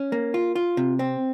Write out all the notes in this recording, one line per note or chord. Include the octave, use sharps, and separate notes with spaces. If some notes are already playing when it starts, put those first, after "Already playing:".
Already playing: C#4
A#3
F4
F4
C3
C4